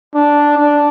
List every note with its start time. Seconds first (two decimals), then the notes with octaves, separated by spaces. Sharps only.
0.15 D4
0.58 D4